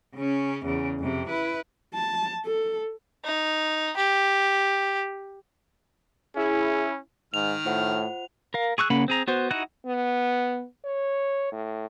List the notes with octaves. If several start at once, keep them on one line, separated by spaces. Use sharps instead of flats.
C#3 C#4
E2 C#3
F2 C3
E4 B4
A5
A4
D#4
G4
C#4 E4 G#4
G#2 D#3 F6 F7
A2 F4 C5 F#5
A#4 F5
G#4 C#6 E6 F#6
C#3 A#3 C#4 F#5 B5
C4 G#4 A#5
B3 F#4 C5
D#4 E4 F#4 F#5 F#6
B3
C#5
A2